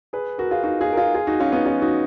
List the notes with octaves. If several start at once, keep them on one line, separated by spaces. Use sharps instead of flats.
G#4 B4
F#4 A#4
F4 G#4
D#4 F#4
F4 G#4
A#4
F4 G#4
F4 G#4
D#4 F#4
C#4 F4
B3 D#4
C#4 F4
D#4 F#4